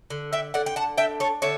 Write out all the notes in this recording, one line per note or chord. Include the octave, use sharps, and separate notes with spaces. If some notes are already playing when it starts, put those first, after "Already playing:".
D3
E5 G5
D3 D5 F#5
G5
F#5 A5
D4 E5 G5
A4 C#5
D3 C#5 E5